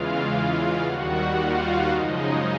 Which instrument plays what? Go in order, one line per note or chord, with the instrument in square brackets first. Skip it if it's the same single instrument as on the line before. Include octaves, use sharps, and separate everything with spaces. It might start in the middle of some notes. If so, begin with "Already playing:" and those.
Already playing: [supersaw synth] E2 C#3 E3 G#3 F4 F5
D#2 D#3 G3 F#4 F#5
F4 F5
F#2 C#3 F3 G#3 D#4 D#5